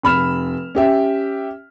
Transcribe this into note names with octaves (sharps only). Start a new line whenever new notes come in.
F1 B5 F6 E7
C#4 G4 E5